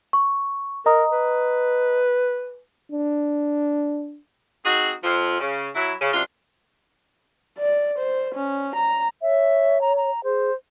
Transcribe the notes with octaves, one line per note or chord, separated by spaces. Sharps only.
C#6
A#4 D#5 A#5 D#6
B4
D4
C4 D#4 F#4 G#4
F2 F3
C#3
F#3 E4
C#3
F#2 C3 D4 F4
D5
C5
C#4
A#5
C#5 E5
A#5
A#5
G#4 C5